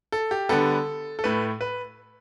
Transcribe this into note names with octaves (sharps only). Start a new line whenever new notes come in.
A4
G4
D3 G3 B3 A4
A4
A2 A3 B4
B4